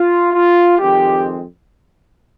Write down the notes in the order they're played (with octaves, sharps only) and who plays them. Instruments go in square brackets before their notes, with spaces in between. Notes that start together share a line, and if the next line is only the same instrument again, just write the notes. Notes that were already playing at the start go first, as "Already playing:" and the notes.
Already playing: [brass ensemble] F4
F4
F2 D#3 G#3 C4 G4